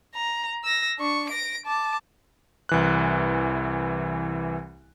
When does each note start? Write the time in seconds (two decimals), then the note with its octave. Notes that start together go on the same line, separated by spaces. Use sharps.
0.15 A#5
0.64 E6 A#6
0.99 D4 C#6
1.30 A#6 D7
1.66 A5 D6
2.69 C2 E3 F#6